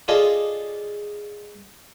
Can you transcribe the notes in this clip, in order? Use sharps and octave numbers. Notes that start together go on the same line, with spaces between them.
F4 G#4 A4 D5 D#5